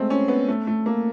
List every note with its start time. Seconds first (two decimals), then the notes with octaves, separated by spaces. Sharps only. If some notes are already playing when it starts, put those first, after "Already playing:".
Already playing: G#3 A3 C4
0.10 C#4
0.28 B3
0.48 A3
0.67 A3
0.86 A#3